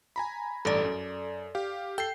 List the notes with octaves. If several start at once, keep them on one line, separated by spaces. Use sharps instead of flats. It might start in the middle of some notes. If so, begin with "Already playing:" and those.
G#5 A#5 B5
A1 G2 A4 D5
F#2
G4 F5
A4 G5 C7